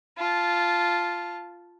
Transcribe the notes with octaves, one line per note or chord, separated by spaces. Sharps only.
F4 A5